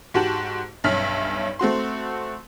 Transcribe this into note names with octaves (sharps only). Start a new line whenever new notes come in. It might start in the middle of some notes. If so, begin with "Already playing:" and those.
G#2 F#4 G4 A5 F#7
B1 G2 C#4 E5 F6 B6
A3 C4 F#4 C6